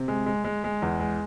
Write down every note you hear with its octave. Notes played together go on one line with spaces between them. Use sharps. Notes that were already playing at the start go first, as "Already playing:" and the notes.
Already playing: C3
G#3
G#3
G#3
G#3
E2
G#3